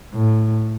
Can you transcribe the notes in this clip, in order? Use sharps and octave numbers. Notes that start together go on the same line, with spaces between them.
A2